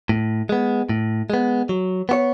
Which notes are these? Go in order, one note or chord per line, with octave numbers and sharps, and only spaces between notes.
A2
G#3 B3
A2
G#3 B3
F#3
B3 F#4 C#5